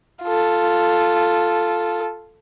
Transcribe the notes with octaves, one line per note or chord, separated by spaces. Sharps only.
F4 A4